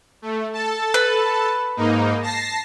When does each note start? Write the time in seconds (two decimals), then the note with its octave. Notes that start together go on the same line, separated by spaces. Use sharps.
0.22 A3
0.53 A4 A5
0.94 B4
1.77 G#2 A#3 D#4
2.22 A5 A#6 C7